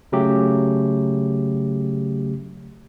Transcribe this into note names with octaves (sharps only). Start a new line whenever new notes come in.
C#3 F#3 A3 G4